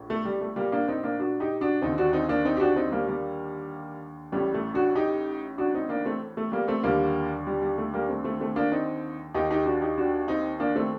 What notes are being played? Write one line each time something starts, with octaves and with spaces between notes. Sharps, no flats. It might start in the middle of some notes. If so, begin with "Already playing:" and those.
Already playing: A#1 A2
A3
G3
A3
G3 A#3
A#3 D4
C4 D#4
A#3 D4
D4 F#4
D#4 G4
D4 F#4
D#2 D3 C4 D#4
D4 F#4
C4 D#4
A#3 D4
C4 D#4
G4
D4 F#4
C4 D#4
G3 A#3
G3 A#3
A1 A2 G3
A3
D4 F#4
D#4 G4
D4 F#4
C4 D#4
A#3 D4
A3 C4
A3
G3 A#3
A3 C4
D#2 D3 G3 A#3
G3
G3
A3
G3 A#3
A3 C4
A3 C4
A3 C4
A#3 D4
C4 D#4
D#2 D#3 D#4 G4
D#4 G4
D4 F#4
D#4 G4
D4 F#4
C4 D#4
A#3 D4
A3 C4